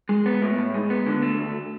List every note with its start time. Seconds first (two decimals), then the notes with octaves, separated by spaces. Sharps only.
0.09 G#3
0.26 B3
0.42 A2
0.58 A2
0.74 G#3
0.90 B3
1.06 D3
1.22 A3
1.38 D2